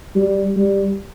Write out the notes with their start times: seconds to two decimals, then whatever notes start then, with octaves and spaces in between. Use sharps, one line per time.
0.15 G3
0.57 G3